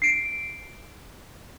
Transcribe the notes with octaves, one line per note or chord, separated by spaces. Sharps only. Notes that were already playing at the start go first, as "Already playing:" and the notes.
C7 D7